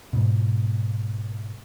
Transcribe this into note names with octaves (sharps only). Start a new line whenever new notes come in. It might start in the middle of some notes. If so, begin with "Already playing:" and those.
G#2 B2